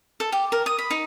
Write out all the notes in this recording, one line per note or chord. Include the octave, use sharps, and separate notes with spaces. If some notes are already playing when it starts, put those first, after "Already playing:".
A4
G4
A#4
D#6
B5
D#4